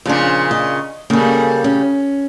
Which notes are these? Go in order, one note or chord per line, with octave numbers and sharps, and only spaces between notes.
F2 A#2 C#3 D4 C5
D#5
C#3 G3 A#3 A4
C#4